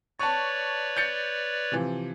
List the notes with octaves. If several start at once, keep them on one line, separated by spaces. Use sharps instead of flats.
B4 C#5 D5 A5 C#6
G6 A6 C#7
C3 E3 F3